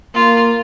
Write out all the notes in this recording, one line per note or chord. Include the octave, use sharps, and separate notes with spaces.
A#3 F4